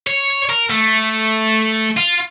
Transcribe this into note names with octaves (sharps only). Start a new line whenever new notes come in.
C#5
A#4
A3
F4